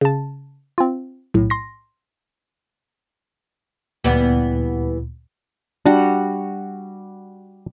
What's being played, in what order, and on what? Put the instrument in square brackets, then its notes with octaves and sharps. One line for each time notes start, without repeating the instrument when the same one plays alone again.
[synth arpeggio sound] C#3 A5
C4 F4
B1 A2
C6 A#6
[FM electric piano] D2 A#2 [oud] E3 G3 B3
[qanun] G3 F#4 F#5 [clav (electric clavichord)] D4